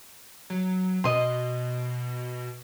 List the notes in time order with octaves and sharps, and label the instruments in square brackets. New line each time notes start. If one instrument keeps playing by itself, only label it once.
[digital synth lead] F#3
[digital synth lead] B2 [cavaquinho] D#5 C6